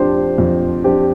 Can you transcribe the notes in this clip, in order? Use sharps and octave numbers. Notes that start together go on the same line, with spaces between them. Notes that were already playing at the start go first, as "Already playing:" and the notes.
Already playing: F2 F3 D4 G4 C5
F2
F3 D4 G4 C5